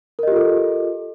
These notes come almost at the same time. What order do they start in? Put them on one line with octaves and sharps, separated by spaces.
A#4 D#5 G4 F4 A4